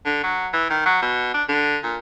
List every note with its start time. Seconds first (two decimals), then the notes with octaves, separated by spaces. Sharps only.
0.05 D3
0.23 F#3
0.53 E3
0.70 D#3
0.85 F#3
1.02 B2
1.34 D4
1.49 D3
1.84 A#2